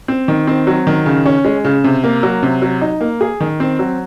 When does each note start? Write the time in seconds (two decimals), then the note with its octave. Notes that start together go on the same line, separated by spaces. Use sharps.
0.08 C4
0.28 D#3
0.47 C4
0.67 F#3
0.87 D#3
1.06 C#3
1.26 C#4
1.45 G#3
1.65 C#3
1.84 C3
2.04 A#3
2.23 F#3
2.43 C3
2.62 F#3
2.81 D#4
3.01 A#3
3.21 G#4
3.41 D#3
3.60 C4
3.79 F#3